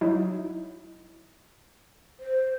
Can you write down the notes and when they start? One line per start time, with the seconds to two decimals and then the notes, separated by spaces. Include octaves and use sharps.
0.01 F#3 D#4 E4
2.20 C5